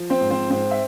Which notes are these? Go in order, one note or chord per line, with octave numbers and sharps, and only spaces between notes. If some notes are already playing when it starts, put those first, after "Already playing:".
Already playing: F3
C4 C5
G#2
C4 C5
G#2 C4 C5
E5